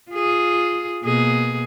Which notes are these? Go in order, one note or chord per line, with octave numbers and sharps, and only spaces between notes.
F4 G#4
B2 A#3 G#4